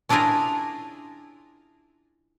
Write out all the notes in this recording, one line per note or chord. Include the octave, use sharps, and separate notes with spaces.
C#4 D4 E4 F4 G#4 A#4